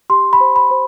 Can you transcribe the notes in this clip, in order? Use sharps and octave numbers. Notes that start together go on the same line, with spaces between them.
G4 C6
B5
C5
B5
C5